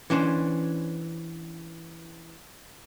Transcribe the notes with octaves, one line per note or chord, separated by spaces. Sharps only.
E3 C#4 D4 C5